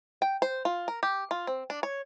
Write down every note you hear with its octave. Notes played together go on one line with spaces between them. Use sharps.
G5
C5
F4
A#4
G4
F4
C4
D4
C#5